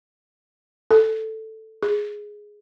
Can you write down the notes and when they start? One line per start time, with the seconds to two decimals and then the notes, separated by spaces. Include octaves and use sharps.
0.91 A4
1.83 G#4